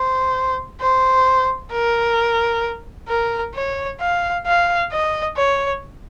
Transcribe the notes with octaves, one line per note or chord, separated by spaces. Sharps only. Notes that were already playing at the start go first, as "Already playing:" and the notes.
Already playing: C5
C5
A#4
A#4
C#5
F5
F5
D#5
C#5